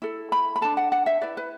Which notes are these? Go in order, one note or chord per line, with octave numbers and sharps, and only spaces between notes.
E4 A4
B5
B5
D4 A4 A5
F#5
F#5
E5
E4 B4 D5
B4